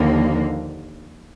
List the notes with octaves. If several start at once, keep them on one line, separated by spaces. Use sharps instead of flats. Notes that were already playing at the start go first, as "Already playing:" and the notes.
Already playing: D#2 D3 F3 A#3